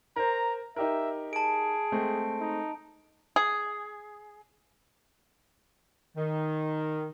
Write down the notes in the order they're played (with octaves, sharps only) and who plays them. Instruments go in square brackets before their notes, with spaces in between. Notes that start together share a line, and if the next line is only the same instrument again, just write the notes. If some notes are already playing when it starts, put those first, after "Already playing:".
[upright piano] A#4 C5 [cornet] A#5
[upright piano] D#4 G4 A#4 [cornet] E5
[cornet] G#4 [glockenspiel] A5 D7
[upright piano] G#3 A3 C4
[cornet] D#4
[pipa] G#4
[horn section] D#3